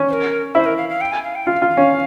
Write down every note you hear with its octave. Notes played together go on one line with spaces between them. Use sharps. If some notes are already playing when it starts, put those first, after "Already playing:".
Already playing: C#4
C5
A#4
E4 C5
A#4
F5
F5
G5
G#5
F5
G5
F4 F5
F4
F5
C#4